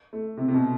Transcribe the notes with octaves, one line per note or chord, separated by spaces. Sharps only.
A3
C3
C3
B2